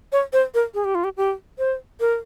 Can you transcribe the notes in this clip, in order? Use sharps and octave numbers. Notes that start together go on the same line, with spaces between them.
C#5
C5
A#4
G#4
G4
F4
G4
G4
C5
A#4